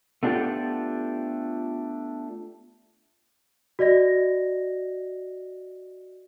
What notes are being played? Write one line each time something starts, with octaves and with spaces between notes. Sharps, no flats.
A3 B3 D4 F4 G4 A4
F#4 D5 D#5 A#6